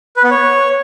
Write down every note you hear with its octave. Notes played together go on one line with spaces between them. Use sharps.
B4
B3
C#5